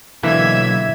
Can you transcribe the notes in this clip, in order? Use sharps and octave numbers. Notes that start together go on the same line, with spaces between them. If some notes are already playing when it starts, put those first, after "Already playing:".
B1 D3 E3 A#3 E5 G#6